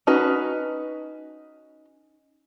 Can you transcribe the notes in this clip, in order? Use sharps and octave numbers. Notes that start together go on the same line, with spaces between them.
C#4 D#4 F#4 B4